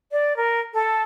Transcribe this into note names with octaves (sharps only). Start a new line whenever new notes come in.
D5
A#4
A4